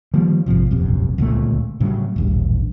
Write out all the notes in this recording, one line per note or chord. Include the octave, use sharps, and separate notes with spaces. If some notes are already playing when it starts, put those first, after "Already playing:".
D#3 F3 G3 A#3
A1 G2 C3 F3
E1 A#1 F#2 C3
D1 C#2 A#2 A3
A2 C#3 F#3 G3
D#1 A1 G2